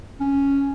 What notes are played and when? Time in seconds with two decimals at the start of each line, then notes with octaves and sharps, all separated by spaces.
0.20 C#4